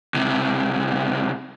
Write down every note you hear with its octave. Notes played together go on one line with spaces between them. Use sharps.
C#2 C3